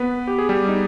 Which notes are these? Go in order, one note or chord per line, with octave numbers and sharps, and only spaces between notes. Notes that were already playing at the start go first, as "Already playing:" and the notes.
Already playing: B3 B4
G4
G#4
G3 G4
D#4